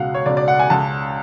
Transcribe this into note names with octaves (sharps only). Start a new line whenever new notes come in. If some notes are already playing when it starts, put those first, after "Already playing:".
Already playing: C#2 B2 F5 F#5
C#5
C#2 B2 D5
D5
F#5
G#5
C#2 C#3 A5